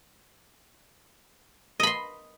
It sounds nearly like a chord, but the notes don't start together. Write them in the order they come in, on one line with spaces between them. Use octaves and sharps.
D#5 B5 C6